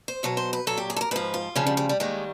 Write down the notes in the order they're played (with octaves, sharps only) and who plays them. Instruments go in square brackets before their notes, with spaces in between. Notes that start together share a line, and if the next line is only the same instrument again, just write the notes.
[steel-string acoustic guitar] C5
E2 B2 F#3 C#5
C5
B4
A#2 F#3 A4
G4
G#4
A4
A#4
G#2 F3 B4
F4
D2 C#3 F3 C#4
G3
G3
G3
D#2 D#3 G3 G#3